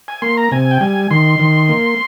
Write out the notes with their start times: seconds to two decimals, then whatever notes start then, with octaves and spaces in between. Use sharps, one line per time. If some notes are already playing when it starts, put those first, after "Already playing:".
0.08 G#5
0.22 A#3 C6
0.37 A#5
0.51 C3 G#5
0.71 G5
0.81 G3 G#5
1.11 D#3 C6
1.39 D#3
1.69 A#3